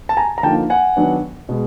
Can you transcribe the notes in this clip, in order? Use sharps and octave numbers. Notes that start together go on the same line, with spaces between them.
A5
G#5 A#5
A#5
D3 F3 A#3 D#4 G5 A5
F#5 G#5
D#3 F#3 B3 D4
B2 G#3